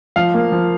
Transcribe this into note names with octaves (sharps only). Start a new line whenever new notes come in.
F3 F5
A#3
F3